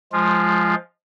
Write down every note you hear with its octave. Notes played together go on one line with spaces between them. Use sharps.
F3 G#3 F4